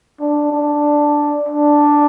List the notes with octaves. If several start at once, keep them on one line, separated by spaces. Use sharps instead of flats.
D4
D4
D4